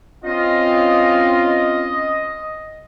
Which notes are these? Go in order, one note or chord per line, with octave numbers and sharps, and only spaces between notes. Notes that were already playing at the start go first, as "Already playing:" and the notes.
C4 C#4 F4 D#5